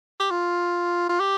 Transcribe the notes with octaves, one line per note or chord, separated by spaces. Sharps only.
G4
F4
F4
G4